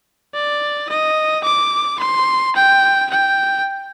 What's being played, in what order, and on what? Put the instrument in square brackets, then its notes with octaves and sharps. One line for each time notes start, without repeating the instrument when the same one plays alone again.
[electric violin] D5
D#5
D6
C6
G5
G5